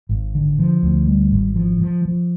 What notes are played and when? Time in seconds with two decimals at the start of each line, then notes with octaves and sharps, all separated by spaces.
0.09 G#1
0.35 D3
0.59 F3
0.83 D2
1.07 G3
1.32 G#1
1.56 F3
1.81 F3
2.05 F3